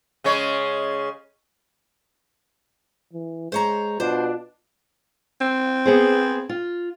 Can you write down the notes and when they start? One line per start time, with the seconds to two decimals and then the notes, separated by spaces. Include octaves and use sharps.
0.24 C#3 G#3 C#5
3.13 E3
3.52 G#3 C5 C#5 A#5
4.00 B2 D4 F4 C5
5.41 C4
5.86 B3 G#4 C5
6.49 F4